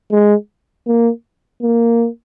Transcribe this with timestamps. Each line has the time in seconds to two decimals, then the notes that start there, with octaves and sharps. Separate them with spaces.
0.12 G#3
0.87 A#3
1.62 A#3